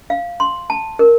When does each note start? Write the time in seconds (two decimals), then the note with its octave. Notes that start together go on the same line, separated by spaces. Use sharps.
0.10 F5
0.40 C6
0.70 A5
0.99 A#4